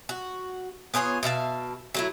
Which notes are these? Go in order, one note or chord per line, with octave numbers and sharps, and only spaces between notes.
F#4
B3 F4 G#4 C#5
B2 E5 F5 A5
F#3 A3 E4